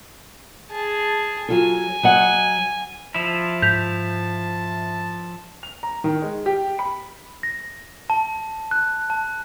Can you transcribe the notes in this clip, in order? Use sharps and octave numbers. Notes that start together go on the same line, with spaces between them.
G#4 A5
F#3 F4 A4 G#5
F#3 D#5 F#5
F3 E4 A5
G#2 G6 B6 F7
F7
A#5
D#3
G#3
G4
B5
A#6
A5
F#6
A5